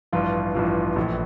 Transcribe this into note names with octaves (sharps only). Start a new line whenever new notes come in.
A1 G2 F3 F4
A1 G2 F3
A#1 A2 E3